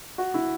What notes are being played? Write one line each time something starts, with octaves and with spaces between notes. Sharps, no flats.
F#4
E4